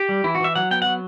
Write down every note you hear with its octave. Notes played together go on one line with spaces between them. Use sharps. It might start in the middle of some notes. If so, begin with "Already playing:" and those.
Already playing: G4
G3
E3 E4
F#4
E3 E5
F#3 F#5
B3 G5
F#3 F#5